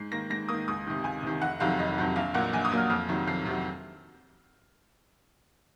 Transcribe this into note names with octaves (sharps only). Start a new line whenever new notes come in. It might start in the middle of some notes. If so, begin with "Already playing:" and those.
Already playing: G#2 C7
D#3 A#3 A#6
G#2 A#6
D#3 A#3 D#6
C#2 D#6
C3 D#3
C#2 G#5
C3 D#3
F1 F#5
F2 C3 D#3 F#3 F5
F1 D#5
F2 C3 D#3 F#3
A#1 F5
A#2 F#3 A#3 F#5
A#1 G#5
D#6
A#2 F#3 A#3
F6
F2 F6
C3 D#3 F#3
F2 C7
C3 D#3 F#3